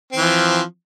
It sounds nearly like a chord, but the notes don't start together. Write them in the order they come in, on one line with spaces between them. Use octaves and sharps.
C4 E3 F3